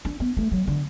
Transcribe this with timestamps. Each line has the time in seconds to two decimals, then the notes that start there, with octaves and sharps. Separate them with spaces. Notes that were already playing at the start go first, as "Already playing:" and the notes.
0.05 D4
0.20 B3
0.37 A3
0.52 F#3
0.67 D3